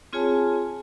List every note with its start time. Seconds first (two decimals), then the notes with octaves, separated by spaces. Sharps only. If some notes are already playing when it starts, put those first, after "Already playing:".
0.13 C4 F4 G#4 C#5 G#5 A5